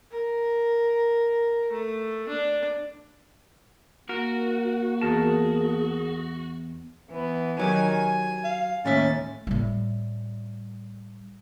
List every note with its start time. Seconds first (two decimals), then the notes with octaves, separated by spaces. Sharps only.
0.12 A#4
1.72 A3
2.29 D4
4.09 A#3 F#4 A#4
5.01 E2 G#4 A#4 A5
7.12 E3 B3
7.59 D#3 F#3 G4 G#5
7.91 G#5
8.44 F5
8.86 D#2 A2 C#4 E5 A6
9.47 A2 G3